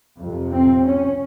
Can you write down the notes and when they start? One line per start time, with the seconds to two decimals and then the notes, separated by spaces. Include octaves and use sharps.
0.20 F2 C3
0.52 C4
0.85 C#4